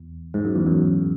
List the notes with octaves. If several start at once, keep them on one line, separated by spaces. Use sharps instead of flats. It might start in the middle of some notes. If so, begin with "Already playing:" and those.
Already playing: E2
G#2
F#2
E2
F#2